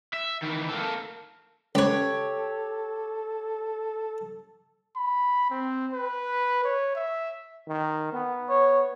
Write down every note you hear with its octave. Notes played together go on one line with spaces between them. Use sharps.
E5
D#3 E3
A#3 A4
C#2 G4 A4 B4 C#5
B5
C4
B4
C#5
E5
D#3
B3
C#5